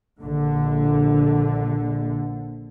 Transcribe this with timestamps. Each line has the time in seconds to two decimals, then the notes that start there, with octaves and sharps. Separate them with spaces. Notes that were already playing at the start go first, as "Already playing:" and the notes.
0.22 A#1 D3